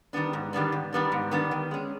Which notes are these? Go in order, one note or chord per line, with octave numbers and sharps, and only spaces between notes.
D#3 G3 B3 D4
G#2
D#3 G3 B3 D4
G#2
D#3 G3 B3 D4
G#2
D#3 G3 B3 D4
D#3
G#3 C#4